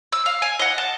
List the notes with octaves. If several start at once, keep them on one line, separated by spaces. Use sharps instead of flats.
E6
F5
G#5
D#5 F#5
A5